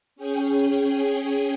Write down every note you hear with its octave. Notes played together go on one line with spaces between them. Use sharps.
C#4 G#4 G5